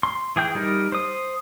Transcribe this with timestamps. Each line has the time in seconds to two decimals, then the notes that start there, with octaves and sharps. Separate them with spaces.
0.03 C6
0.36 E3 G#4 G5 G6
0.55 G3 D#4 A#4
0.92 C5 D#6